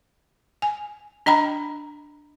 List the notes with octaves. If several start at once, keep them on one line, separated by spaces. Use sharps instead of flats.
G#5
D4 D#5 G5 A#5 B5